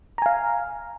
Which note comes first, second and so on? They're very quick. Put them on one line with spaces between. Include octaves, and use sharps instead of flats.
A#5 G#5 F5